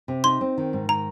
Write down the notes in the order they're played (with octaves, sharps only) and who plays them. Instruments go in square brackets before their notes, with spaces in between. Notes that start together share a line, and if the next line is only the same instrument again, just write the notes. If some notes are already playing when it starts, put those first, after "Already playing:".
[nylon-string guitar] C3
[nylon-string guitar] D#4 [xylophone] C6
[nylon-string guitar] C4
D#3
G#2
[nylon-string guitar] D#3 [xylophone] A#5